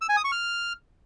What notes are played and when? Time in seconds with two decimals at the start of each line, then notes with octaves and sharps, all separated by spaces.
0.01 E6
0.09 G#5
0.17 D#6
0.24 C#6
0.32 F6